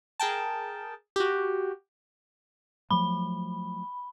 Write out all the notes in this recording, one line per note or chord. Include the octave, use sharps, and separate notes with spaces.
G#4 A#4 G5 A5
F#4 G4
F3 F#3 A3 B5